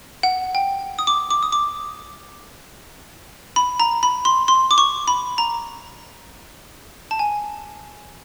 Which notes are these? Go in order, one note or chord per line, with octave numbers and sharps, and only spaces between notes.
F#5
G5
D#6
D6
D6
D#6
D6
B5
A#5
B5
C6
C6
D6
C#6
B5
A#5
A5
G#5